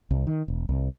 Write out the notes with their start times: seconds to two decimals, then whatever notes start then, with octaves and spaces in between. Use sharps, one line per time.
0.11 C2
0.27 D#3
0.48 E1
0.69 C2